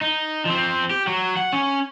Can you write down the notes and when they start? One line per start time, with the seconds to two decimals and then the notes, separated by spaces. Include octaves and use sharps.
0.01 D#4
0.45 F3 C4
0.90 G4
1.07 F#3
1.37 F#5
1.53 C#4